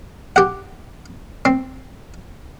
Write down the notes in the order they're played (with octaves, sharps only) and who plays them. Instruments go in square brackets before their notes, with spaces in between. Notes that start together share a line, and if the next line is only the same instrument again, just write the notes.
[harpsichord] G4 F#5
C4